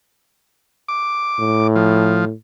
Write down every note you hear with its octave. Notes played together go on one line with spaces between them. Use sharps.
D6
A2
F3